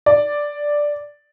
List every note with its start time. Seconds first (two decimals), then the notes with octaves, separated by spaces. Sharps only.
0.06 D5